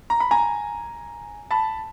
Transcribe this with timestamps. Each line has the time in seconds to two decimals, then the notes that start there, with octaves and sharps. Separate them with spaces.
0.10 A#5
0.20 B5
0.31 G#5 A#5
1.51 A5 B5